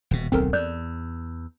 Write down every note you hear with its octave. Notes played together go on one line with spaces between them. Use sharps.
D#1 B2
D1 B1 C4 A4 A#4
E2 D5 F#6 G6